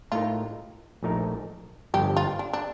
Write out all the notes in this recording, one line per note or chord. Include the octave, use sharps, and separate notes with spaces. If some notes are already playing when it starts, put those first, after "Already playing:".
A2 A3 D#4 F4 A#4
A#1 A#2 A3 D#4 A#4
G1 G2 F3 G4
F4
D4
D4